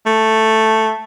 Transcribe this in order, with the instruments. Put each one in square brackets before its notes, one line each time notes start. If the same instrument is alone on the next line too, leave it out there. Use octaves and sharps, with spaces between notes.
[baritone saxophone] A3